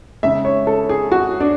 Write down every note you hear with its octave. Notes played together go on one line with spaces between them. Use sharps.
C#3 G#3 E5
C#5
A4
G#4
F#4
D4